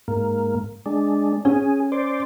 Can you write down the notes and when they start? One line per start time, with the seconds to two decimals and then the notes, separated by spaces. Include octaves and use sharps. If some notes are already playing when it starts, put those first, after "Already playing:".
0.08 G#2 A#3
0.86 G#3 D4
1.45 C#4 G#4
1.92 C5 D5